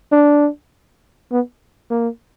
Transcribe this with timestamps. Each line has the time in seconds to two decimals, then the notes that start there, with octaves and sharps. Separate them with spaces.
0.12 D4
1.32 B3
1.91 A#3